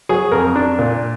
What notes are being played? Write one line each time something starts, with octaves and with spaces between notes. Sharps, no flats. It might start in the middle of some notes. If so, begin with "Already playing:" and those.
F#3 G#4
F2 A#4
D4
A#2